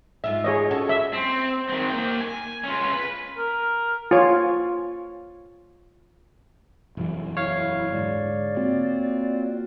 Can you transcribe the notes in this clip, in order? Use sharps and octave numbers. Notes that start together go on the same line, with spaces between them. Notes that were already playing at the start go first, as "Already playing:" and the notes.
G#2 F4 E5
G#4 C#5 D#5
C#4 F#4 A4
E5
C4
D#3 C4
A#3 G5
G#5
C#4 F4
B4
A#4
F4 C#5
E1 F#2 E3
E4 C#5 F5
G#2 D3 G#3 D5
A#3 C4 F4 F#4